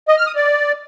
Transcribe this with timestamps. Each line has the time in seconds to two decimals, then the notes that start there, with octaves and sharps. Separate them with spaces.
0.08 D#5
0.17 F6
0.27 D#6
0.36 D5